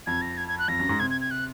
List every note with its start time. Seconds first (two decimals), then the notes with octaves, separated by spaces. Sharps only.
0.06 F2 G#6
0.22 A#6
0.38 G#6
0.48 G#6
0.59 F#6
0.68 F2 A#6
0.80 F#2
0.89 G#2
1.00 C3 G#6
1.10 G#6
1.21 G#6
1.31 F#6